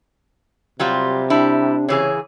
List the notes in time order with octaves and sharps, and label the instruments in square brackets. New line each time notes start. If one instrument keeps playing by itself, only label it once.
[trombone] C3 [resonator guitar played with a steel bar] F#3 G3 F4
[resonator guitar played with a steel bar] G3 E4 [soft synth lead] D4
[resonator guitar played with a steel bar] C#3 E3 G#4 [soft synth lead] C#5